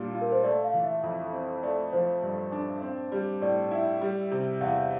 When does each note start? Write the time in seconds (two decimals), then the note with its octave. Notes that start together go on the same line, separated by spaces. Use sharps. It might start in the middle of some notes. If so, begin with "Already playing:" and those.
Already playing: A#2 G3 D4
0.14 F4
0.21 A#4
0.32 C5
0.44 A3 D5
0.64 F5
0.74 E3
0.84 E5
1.03 F2
1.33 C4
1.63 A3 D5
1.93 F3 C5
2.23 G2
2.52 D4
2.82 C4
3.12 G3
3.41 A2 D5
3.71 E4
4.01 G3
4.31 C3
4.61 E2 F5